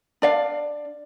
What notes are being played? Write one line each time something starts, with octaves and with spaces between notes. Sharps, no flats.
D4 D5 F5